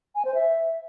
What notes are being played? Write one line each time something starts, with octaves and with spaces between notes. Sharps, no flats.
G#5
C5
E5